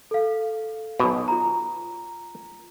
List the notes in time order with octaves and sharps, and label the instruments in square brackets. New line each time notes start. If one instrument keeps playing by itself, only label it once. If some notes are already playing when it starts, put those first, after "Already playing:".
[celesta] A4 F5
[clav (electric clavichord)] B1 B2
[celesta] F4 A#5